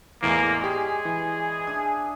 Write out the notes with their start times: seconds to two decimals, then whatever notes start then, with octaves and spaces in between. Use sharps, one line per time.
0.22 E2 A2 E3 G#3 A#3 G#4 D5
0.64 G4 G#4 C#5
1.05 E3
1.67 D4 E5 G#5 D#6